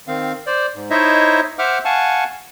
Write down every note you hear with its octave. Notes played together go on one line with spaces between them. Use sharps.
D#3 C4 F5
C5 D5
G#2
D#4 E4 C5 C#5 D#5 E5
C5 E5 F#5 D6 F6
F5 F#5 G#5 A5 C#6